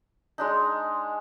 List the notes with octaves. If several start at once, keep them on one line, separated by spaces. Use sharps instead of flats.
G#3 D4 D#4